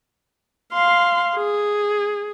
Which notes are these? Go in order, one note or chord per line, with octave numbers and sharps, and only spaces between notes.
F5 C6
G#4